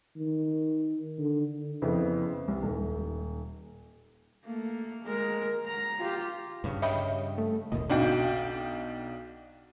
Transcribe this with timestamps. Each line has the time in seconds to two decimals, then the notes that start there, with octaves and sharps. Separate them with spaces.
0.16 D#3
1.18 D3
1.82 F2 C#3 B3 C4 E4
2.48 C2
2.63 D#1
4.45 A3 A#3
5.04 G#3 A#4
5.67 A#5
5.99 F4 G4
6.64 G2 C#3 G3
6.82 C#5 D#5 E5 G5 B5
7.38 A3
7.72 G1 D#2 A#2 D#5
7.90 B1 D4 D#4 F#4 F5 G5